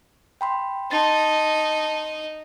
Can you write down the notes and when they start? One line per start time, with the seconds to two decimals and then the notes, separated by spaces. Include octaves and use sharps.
0.41 G5 B5 C6
0.91 D#4 A5 C6 A6